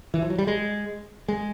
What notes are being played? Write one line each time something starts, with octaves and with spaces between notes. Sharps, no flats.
E3
F3
F#3
G3
G#3
G#3